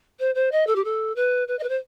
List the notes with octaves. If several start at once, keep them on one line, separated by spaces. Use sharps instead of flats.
C5
C5
D#5
A4
G4
A4
B4
B4
D#5
B4
C5